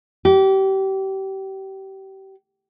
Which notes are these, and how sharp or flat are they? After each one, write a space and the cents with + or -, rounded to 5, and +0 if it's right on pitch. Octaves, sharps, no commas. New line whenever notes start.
G4 -30